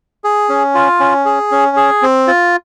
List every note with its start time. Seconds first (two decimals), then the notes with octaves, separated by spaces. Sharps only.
0.24 G#4
0.49 C#4
0.75 F4
1.00 C#4
1.25 G#4
1.51 C#4
1.77 G#4
2.02 C4
2.27 F4